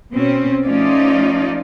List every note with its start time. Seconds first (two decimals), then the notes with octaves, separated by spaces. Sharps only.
0.12 B2 C4 C#4
0.66 F3 A3 C#4 D#4 F4 D5